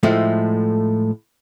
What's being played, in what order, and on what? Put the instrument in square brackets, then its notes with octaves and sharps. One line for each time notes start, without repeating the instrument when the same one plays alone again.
[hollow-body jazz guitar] A2 F3 G#3 A3